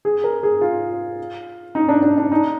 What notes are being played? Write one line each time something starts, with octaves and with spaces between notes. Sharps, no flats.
G#4
A#4
G#4
F4
D#4
D4
D4
D4
D#4